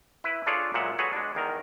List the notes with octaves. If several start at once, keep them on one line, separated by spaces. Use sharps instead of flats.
E4 B4
D4 F4 G#4 A4 C#5 D5
A#2 F#3 G#3 E5 F#5
F#4 G#4 A4 B4 C#5 F#5
G#3 D4
E2 D#3 A#4